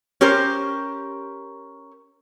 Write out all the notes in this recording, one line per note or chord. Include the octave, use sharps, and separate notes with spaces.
C#4 G4 A#4 C5